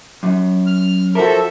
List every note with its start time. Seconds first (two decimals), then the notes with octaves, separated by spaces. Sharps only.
0.23 F#2
0.66 F6
1.15 F3 F#4 A4 A#4 E5